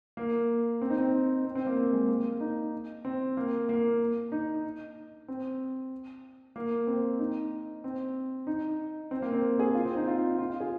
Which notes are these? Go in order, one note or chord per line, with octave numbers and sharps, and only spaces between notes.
A#3
C4
D#4
C4
C4
C4
A#3
A#3
G#3
A#3
D#4
C4
A#3
A#3
D#4
C4
A#3
C4
D#4
C4
D#4
C4
A#3
C4
G#4
F4
C4
D#4
F4
F4
F4
G#4